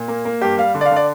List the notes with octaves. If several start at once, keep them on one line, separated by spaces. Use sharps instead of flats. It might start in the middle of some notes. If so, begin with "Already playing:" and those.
Already playing: A#2
A#3
A#3
G2 G4
G3 F5
D3
D5
F5
D3 D5